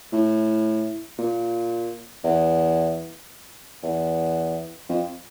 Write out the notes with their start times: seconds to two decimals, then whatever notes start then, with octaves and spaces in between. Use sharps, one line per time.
0.13 A2
1.18 A#2
2.24 E2
3.83 E2
4.89 F2